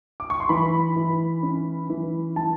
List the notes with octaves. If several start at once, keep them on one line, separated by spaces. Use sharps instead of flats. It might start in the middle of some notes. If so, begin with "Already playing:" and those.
D6
C#6
C6
E3 B5
E3
C#4
E3
E3 A5